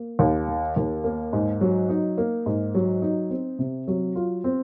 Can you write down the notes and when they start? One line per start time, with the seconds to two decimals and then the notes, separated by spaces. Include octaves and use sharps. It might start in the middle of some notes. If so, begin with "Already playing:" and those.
Already playing: A#3
0.19 D#2
0.48 D#3
0.76 D#2
1.04 A#3
1.33 G#2
1.61 F#3
1.89 D#4
2.18 A#3
2.46 G#2
2.75 F#3
3.02 D#4
3.30 C4
3.59 C3
3.87 F#3
4.16 F4
4.44 C4